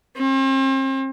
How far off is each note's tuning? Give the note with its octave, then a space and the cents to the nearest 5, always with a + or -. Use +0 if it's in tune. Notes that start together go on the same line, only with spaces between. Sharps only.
C4 +40